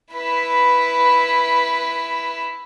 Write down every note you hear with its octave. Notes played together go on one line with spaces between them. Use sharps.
E4 B4